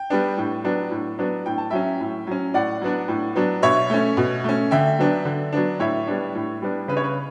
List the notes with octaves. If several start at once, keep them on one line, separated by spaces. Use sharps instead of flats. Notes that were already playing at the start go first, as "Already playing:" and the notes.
Already playing: G5
G3 B3 D4
A2
F#3 B3 D4
A2
F#3 B3 D4
A2 G5
A5
F#3 C#4 E5 G5
A2
F#3 C#4
A2 D5 F#5
F#3 B3 D4
A2
F#3 B3 D4
B2 C#5 E5
A3 C#4
B2
A3 C#4
D3 E5 G5
F#3 B3 D4
D3
F#3 B3 D4
A2 C#5 E5
G3 B3 D4
A2
G3 B3 D4
C#3 B4
C#5
B4